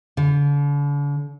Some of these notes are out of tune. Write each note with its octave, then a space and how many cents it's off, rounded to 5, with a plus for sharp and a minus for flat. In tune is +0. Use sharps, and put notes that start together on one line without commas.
D3 -40